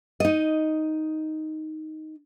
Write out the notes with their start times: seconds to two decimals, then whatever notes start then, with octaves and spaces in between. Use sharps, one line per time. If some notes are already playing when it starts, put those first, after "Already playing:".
0.20 D#4 D#5